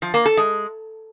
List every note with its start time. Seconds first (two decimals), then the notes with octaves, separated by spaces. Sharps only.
0.02 F3
0.14 A#3
0.26 A4
0.37 G#3